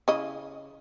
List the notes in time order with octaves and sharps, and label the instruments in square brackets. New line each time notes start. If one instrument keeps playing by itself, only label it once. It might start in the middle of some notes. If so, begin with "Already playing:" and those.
[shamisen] C#3 E4 D#5